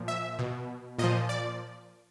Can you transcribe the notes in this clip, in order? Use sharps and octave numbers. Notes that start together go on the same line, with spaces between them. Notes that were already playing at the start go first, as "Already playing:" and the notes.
Already playing: A#2 F3
E5
B2
A#2 F3 D#5
D5